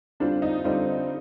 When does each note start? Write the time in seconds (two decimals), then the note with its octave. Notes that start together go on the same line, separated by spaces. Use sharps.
0.20 D3 G3 C4 D4 F4
0.42 D#4
0.64 D3 G3 C4 D#4 F4